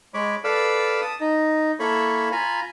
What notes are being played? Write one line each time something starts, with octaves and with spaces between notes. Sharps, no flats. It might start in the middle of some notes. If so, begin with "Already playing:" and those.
G#3 C#5 B5 D6
A4 B4 D5 F5 E6
A5 D#6
D#4
A#3 E4 A4 C#5 B5
F4 G#5 A#5 B5